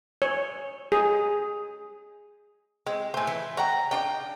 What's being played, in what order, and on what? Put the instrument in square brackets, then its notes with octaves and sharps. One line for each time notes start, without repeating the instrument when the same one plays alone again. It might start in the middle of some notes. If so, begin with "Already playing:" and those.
[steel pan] C#5
G#4
[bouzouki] G#3 [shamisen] C4
[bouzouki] A2 A3 [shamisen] C5 G#5
[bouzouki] E3
[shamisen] C#5 F#5 G5 [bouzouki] A#5
[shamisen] C#3 D4 D#4 [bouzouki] G5